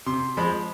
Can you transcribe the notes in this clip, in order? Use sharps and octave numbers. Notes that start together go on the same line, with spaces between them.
C3 C6
F3 G#3 B5